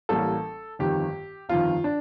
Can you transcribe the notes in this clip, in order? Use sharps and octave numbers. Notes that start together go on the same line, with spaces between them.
A1 A2 G3 A#3 A4
G1 F2 D#3 G4
G1 F2 D#3 F4
D4